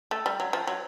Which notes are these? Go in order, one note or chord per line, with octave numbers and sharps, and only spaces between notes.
A3
G3
F#3
F3
F#3